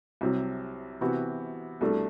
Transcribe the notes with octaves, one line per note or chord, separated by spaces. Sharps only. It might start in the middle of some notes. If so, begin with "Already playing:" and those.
C2 C3 F#3
C3 E3 B3 F#4
C2 B2 A3 D4 A4